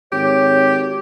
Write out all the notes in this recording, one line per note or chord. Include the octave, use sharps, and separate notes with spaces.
G#1 G4 C#5